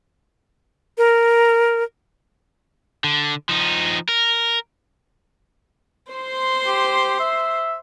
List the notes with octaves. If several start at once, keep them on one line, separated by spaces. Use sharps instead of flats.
A#4
D3
F3 D#4
A#4
C5 C6
G4
E5